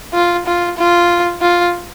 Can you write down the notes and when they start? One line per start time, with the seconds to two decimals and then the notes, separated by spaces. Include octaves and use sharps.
0.14 F4
0.46 F4
0.77 F4
1.41 F4